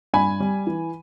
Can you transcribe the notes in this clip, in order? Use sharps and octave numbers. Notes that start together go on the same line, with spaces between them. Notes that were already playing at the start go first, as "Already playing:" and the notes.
G2 G#5 B5
G3
E3